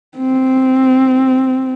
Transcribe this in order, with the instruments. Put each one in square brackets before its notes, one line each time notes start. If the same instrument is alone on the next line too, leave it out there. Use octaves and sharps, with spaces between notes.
[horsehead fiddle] C4